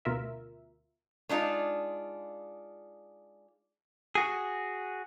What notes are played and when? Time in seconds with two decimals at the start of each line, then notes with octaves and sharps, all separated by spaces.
0.05 D2 B2 F4 A#4 E5
1.29 G#3 D4 D#4 F4
4.15 F#4 G#4